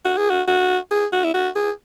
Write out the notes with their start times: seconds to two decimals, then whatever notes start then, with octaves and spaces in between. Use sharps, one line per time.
0.05 F#4
0.17 G#4
0.30 F#4
0.48 F#4
0.91 G#4
1.13 F#4
1.24 E4
1.34 F#4
1.56 G#4